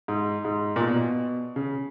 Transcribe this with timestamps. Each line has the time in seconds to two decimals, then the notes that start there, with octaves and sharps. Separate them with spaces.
0.08 G#2
0.45 G#2
0.76 A#2
0.81 B2
1.56 C#3